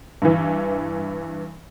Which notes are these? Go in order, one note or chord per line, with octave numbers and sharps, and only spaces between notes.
G2 E3